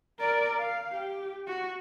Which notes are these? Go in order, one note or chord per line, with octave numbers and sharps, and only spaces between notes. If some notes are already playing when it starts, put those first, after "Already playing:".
A#4 D5
F5
G4
F#4